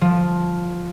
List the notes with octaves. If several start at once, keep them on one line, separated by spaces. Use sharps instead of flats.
F3